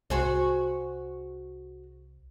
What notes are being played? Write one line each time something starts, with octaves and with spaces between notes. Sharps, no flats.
C2 F#4 G#4 C5